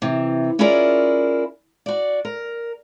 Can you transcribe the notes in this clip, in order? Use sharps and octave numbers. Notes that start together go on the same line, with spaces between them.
C3 E3
C#4 E4 F4 G#4 A#4 D5
F#4 D5
A#4